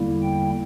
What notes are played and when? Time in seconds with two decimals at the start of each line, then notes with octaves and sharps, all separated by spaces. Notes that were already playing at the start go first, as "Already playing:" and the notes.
Already playing: E2 D3 G3 A#3 E4
0.22 G5